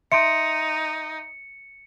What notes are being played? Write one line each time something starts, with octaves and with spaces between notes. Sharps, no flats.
D#4 E5 C6 C#7 D7